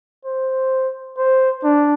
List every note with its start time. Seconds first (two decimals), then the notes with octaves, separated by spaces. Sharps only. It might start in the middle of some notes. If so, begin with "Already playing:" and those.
0.25 C5
1.18 C5
1.64 D4